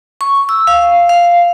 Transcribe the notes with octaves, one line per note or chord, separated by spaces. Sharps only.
C#6
E6
F5
F5